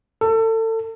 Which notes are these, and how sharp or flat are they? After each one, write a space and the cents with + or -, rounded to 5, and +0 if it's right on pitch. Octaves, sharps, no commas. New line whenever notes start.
A4 +30